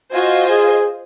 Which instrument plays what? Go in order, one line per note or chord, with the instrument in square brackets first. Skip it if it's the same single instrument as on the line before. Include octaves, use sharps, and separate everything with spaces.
[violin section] F4 C5 D#5 G#5 [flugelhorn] F#4
[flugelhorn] G#4